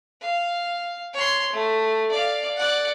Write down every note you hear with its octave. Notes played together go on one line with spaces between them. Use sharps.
F5
C#5 C6
A3
D5 F5
D5 F#5